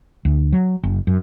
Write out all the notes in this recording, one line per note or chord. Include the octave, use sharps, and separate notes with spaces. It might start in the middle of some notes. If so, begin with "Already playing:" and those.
D2
F#3
F#1
F#2